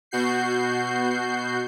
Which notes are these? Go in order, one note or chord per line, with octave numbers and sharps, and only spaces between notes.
B2 F#4 G6 C7